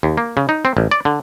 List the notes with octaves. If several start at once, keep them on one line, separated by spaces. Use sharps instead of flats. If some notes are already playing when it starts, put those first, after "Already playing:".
D#2
A#3
C#3
D#4
C4
A1
D5
D3